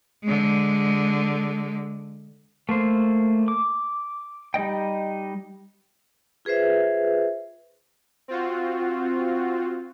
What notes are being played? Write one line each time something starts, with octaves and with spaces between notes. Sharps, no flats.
D3 G#3
A3 A#3 C5
D6
G3 D#4 D#5 G5
F4 G#4 B4 C5 E5
C4 F4 F#4